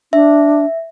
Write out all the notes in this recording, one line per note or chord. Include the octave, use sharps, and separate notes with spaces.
D4 E5